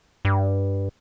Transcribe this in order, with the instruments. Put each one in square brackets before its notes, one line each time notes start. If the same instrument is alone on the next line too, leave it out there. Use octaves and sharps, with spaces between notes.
[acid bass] G2